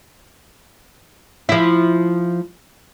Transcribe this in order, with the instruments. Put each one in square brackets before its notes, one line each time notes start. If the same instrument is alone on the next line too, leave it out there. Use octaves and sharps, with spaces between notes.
[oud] F3 E4